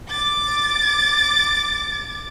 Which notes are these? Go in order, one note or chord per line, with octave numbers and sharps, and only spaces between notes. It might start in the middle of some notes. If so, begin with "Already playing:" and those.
D6 A6